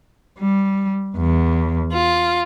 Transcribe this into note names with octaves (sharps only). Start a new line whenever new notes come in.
G3
E2
F4